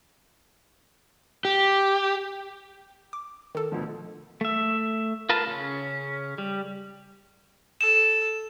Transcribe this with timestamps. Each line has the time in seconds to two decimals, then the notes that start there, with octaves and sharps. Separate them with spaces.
1.45 G4
3.13 D6
3.55 D#3 A4
3.72 D2 B2 F3
4.41 A3 E5
5.29 F4 A#4 B4 A5
5.47 C#3 C#4
6.38 G3
7.81 A4 E7